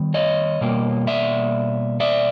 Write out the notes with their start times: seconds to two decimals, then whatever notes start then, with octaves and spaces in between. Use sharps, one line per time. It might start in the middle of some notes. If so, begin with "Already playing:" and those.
Already playing: D#3 G3 B3
0.14 C#5 D#5
0.61 B2 G3 A#3
1.07 D5 E5
2.00 D5 E5